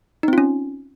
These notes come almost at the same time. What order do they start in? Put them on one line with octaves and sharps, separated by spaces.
D#4 C4 F4 C#4